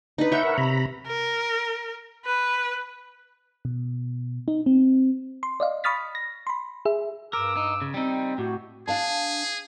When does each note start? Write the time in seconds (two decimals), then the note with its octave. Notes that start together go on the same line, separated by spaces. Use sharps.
0.18 D4 D#4 B4
0.32 C#5 E5 F#5 G6
0.43 A#4 F#5
0.58 C3 A#5 B5
1.07 A#4
2.25 B4
3.65 B2
4.48 D#4
4.66 C4
5.43 C6
5.60 D5 D#5 F5
5.84 B5 C#6 D#6 F6 A6 B6
6.15 A#6
6.47 B5 C6
6.85 G#4 E5
7.33 G2 A#4 D6 E6
7.57 D#4
7.82 C#3
7.94 G3 C4 D#4
8.38 A2 F#4 G4
8.88 D4 G#4 F5 A5